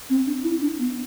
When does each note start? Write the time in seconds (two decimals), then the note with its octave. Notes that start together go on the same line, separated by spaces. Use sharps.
0.10 C4
0.26 D4
0.44 E4
0.61 D4
0.79 B3